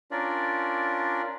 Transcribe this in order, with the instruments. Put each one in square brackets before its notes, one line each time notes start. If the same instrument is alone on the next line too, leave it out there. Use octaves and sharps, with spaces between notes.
[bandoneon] C#4 D4 F4 A#4 D5